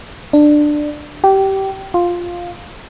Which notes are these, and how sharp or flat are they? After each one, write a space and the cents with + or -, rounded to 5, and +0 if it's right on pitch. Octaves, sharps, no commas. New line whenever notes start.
D4 +15
G4 -20
F4 +5